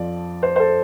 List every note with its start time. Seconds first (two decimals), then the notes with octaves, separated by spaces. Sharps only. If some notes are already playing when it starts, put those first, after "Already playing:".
Already playing: F2 F3 D5
0.43 C5
0.56 C5
0.60 A4